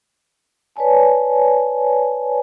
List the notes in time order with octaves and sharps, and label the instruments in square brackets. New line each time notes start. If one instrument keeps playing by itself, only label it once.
[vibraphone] B4 C#5 D5 G#5 A5